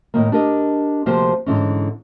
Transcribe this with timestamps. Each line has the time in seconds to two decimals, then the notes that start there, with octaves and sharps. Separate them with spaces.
0.14 A2 D#3 A#3
0.32 D4 G4 A#4 D#5
1.06 D2 C3 F3 A#3 G4 C5
1.46 G#2 D3 E3 C#4